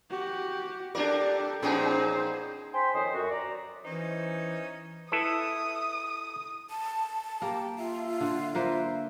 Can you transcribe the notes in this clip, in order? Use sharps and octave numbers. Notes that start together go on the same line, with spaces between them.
F#4 G4
D4 G4 A4 A#4 D5
A#2 F3 B3 C#4 D#4 G#4 C5 G5
C5 G5 G#5 B5 C6
F2 D#3 C#4 C5 C6 D#6
F#2 F#4
D5 A#5
E3 C#4 D#4 C5
E4 A4 B4 D#6
A5
A#3 G4
F4 E5
D3
A#3 B4 C5 E5